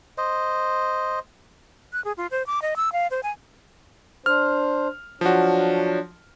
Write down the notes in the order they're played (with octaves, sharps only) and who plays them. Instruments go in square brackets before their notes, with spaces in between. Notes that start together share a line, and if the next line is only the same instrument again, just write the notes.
[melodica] C5 D#5
[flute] F#6
G#4
F4
C5
D6
D#5
E6
F5
C5
G#5
[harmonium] D4 C5 [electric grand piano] F6
[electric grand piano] F3 F#4 [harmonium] F#3 D4